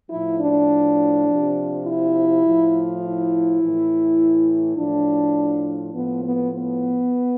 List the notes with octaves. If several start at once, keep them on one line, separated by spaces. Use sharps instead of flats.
A2 F3 E4
D4
C3 F3
E4
A2 F3
E4
A2 E3
A2 F3 D4
A2 F3 B3
B3
B3